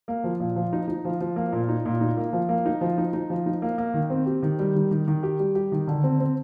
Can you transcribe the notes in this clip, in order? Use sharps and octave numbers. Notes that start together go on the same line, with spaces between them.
A#3
F3
A#2
F3
D#4
D#4
F3
F3
A#3
A#2
D#4
A#2
D#4
A#3
F3
A#3
D#4
F3
D#4
D#4
F3
D#4
A#3
A#3
D#3
C4
G4
D#3
G3
D#3
D#3
D#3
G4
G3
G4
D#3
D3
C4
C4